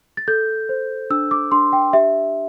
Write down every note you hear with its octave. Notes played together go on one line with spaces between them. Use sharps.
A6
A4 G6
C5
D4 E6
D6
D4 C6
G5
G4 E5